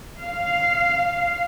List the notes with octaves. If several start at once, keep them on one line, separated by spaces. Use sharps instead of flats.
F5